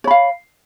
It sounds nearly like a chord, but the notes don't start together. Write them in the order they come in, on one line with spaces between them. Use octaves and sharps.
C#5 B5 F5